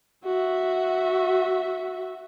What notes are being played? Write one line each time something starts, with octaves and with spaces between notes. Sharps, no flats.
F#4 E5